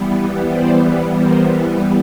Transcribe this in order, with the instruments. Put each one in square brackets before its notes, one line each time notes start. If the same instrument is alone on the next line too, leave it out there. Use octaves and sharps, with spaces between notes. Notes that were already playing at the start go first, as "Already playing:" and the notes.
Already playing: [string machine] E3 G3 B3
C5 D5
A#4 C5